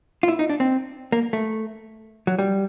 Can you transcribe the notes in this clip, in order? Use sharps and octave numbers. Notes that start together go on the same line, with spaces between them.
F4
E4
D#4
D4
C4
A#3
A3
F#3
G3